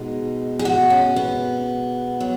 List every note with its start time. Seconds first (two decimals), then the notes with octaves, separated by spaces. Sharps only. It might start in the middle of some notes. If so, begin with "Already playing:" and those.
Already playing: B2 G#3 D#4
0.59 G#4
0.65 F#4
0.90 C#4
1.16 B3
2.20 F#3